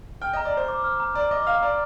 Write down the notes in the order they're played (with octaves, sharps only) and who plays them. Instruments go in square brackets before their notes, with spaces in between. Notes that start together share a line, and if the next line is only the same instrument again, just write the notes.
[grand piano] G5 [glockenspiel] F6
[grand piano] D#5 [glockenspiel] A#5
[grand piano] D5
[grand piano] C5 [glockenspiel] A#5
[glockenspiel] D6
F6
A#5
[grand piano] D5 [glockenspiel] A#5
[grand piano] D#5 [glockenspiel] D6
[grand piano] F5 [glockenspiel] F6
[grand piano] D5 [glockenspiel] A#5